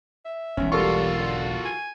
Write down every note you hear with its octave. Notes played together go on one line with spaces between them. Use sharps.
E5
E1 B1 C#4
G3 F4 F#4 A4 A#4 C#6
D3
G#5